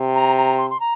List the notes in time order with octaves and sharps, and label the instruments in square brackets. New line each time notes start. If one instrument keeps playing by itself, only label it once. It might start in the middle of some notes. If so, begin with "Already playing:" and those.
Already playing: [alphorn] C3
[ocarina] A#5
A#5
C6
C6
A#5